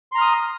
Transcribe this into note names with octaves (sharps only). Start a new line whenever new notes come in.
A#5 C6 D#6 F6